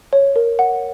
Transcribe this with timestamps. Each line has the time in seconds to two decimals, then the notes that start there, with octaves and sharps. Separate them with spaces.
0.13 C#5
0.36 A#4
0.59 F#5